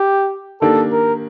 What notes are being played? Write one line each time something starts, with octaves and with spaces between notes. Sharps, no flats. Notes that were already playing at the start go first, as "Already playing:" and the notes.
Already playing: G4
D#3 A#3 D4 G4 A4
A#4